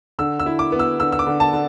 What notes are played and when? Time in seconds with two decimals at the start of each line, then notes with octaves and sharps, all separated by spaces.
0.19 D3 E6
0.40 E6
0.46 E4
0.59 D6
0.72 B3
0.79 E6
1.00 D3 E6
1.12 E6
1.19 D6
1.27 D3
1.40 A5
1.53 D3